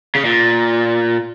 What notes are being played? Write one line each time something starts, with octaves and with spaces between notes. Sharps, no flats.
C#3
A#2